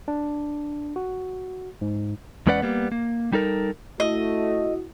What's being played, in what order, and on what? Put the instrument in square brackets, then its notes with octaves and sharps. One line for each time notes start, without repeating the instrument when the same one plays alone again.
[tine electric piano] D4
F#4
G#2
[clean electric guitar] E2 G#3 C#4 B4 D5 F#5
G3 A#3 B3
A#3
G3 D#4 A4 A#4
[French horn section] A3 [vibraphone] E4 [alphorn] F#4 [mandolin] D#5